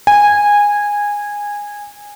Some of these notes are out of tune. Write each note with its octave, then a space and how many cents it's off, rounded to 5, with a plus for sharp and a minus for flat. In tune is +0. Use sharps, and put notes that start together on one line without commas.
G#5 -15